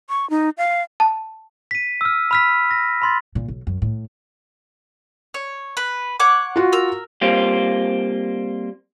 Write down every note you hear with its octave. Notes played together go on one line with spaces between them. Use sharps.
C#6
D#4
F5
A5
B6 D#7
E6 F6
B5 F6 B6
A#6
B5 C6 A6
A#2
B1
F#2
A2
C#5
B4
C#5 F#5 D6
F4 F#4
A#4 E6
G3 A#3 C4 F4